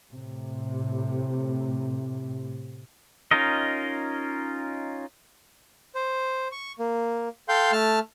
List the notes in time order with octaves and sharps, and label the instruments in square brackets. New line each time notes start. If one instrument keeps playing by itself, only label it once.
[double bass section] A2 C3
[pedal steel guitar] C#4 D#4 F4 A#4 D#5
[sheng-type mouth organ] C5
C#6
A#3
A4 F5 G5 C6 G6
A3 A5 F6